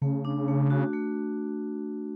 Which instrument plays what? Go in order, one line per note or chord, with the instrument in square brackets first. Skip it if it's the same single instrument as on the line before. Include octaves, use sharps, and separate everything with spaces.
[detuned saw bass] C#3 [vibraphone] A3
[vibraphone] D4
A3
F#4
A3